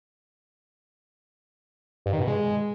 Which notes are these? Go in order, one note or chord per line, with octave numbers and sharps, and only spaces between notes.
G2
D#3
B2
G#3